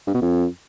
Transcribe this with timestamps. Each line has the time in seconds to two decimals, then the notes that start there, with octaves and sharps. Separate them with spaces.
0.07 G2
0.14 B2
0.22 F2